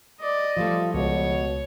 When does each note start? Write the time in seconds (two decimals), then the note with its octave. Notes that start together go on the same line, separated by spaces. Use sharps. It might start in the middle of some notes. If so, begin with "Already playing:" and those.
0.20 D5 D#5
0.57 F3 G3 A3 F4
0.94 C#2 B2 C#5